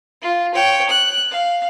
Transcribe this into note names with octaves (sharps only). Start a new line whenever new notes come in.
F4
C#5 G5
F#6
F5